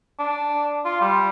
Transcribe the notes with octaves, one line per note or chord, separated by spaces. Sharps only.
D4
F4
G3